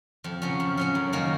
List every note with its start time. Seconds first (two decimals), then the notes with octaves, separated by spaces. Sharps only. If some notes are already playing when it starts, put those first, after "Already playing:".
0.24 F2
0.42 C#3 F#3 C#4
0.60 F2
0.77 C#3 F#3 C#4
0.95 F#2
1.13 D#3 A#3 C#4